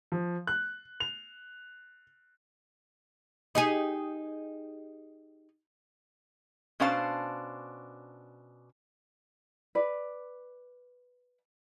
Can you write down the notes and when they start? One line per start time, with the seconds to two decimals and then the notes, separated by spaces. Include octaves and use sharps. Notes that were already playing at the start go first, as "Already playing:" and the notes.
0.12 F3
0.47 F#6
1.00 F7
3.55 D#4 G4 G#4
6.80 B2 C#4 D4 C5 F5 A5
9.75 B4 D5